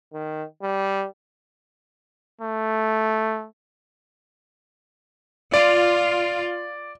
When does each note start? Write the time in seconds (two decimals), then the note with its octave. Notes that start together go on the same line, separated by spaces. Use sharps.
0.13 D#3
0.62 G3
2.41 A3
5.54 F4 D5